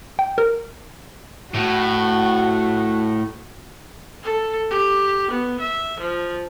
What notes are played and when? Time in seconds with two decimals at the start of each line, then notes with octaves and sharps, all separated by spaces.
0.19 G5
0.38 A#4
1.55 A2 F#4
4.23 A4
4.70 G4
5.30 B3
5.60 E5
6.00 F3